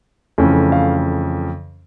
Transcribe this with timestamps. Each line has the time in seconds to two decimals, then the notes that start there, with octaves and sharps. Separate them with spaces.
0.38 F2 C#3 E3 A3 C#4
0.72 F5